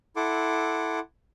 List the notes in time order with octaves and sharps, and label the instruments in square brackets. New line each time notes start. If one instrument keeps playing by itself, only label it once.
[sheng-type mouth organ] E4 A4 F#5 C6 D6